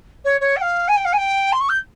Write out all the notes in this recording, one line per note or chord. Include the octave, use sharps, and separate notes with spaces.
C#5
C#5
G5
F5
G#5
G5
F5
G#5
G5
C6
C#6
G6